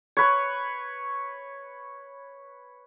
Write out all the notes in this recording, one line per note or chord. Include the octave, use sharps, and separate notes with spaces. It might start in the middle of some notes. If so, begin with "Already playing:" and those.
B4 C#5